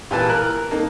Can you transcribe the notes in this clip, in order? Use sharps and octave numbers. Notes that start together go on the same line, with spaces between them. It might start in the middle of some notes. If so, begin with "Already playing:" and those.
A#2 E3 G4 B4 A5
A#4 F#6
A#3 D#4 A4